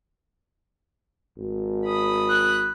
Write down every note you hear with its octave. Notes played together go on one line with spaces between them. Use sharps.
G#1
B5 D#6
F#6